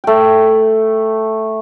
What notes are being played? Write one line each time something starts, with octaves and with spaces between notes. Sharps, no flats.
A3 G5